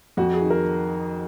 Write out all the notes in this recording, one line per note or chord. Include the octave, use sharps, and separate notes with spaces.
F2 F#4
G#4
D#3
A#4